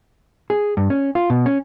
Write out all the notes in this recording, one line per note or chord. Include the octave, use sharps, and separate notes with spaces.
G#4
G2
C#4
F4
B2
C#4